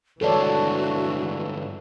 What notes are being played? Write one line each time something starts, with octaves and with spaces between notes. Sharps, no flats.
G2 D3 E3 G#3 F#4 A4 C#5 D5